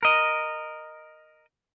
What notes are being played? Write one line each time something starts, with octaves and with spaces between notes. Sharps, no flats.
A#4 D#5